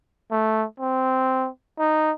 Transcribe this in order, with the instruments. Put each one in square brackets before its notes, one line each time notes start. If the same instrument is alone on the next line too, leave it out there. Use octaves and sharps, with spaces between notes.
[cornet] A3
C4
D#4